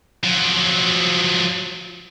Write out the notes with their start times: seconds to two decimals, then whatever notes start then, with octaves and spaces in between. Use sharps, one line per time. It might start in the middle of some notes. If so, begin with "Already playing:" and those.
0.24 F3 F#3